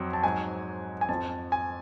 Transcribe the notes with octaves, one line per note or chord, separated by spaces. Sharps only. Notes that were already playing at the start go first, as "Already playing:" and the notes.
Already playing: F2 F#3
A5
G#2 F#3 G#5
G#5
F2 F3 A5
G#5